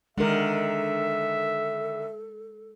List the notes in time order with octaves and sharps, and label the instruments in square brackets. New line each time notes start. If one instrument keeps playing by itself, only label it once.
[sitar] D3 D#3 [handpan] G#3 A#4 [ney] A4 [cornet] E5